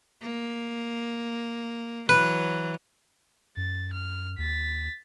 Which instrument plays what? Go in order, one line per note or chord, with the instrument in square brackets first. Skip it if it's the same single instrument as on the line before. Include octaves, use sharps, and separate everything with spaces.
[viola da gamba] A#3
[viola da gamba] E3 F#3 [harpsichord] B4
[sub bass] F#2 [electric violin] A6
[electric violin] F6
[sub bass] D#2 [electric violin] A6 B6